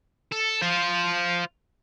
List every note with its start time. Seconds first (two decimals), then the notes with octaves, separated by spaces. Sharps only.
0.32 A4
0.62 F4 C5